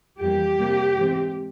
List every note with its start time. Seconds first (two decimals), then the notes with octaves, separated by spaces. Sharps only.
0.20 F2 E3 G3 A#3 G4
0.58 C3 G3 A#3
0.96 G#2 E3 G#3 C4